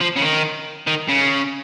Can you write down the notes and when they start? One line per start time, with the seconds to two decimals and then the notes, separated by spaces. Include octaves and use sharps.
0.01 F3
0.16 C#3
0.22 D#3
0.87 D#3
1.09 C#3